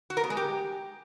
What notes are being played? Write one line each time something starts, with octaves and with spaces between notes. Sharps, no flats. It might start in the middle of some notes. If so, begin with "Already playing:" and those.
F#4
A#4
B3
G#3
G4